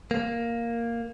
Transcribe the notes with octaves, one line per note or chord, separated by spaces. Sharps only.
A#3